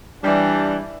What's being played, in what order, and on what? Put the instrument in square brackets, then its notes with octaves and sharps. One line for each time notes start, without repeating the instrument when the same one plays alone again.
[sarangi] E3 [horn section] G3 D4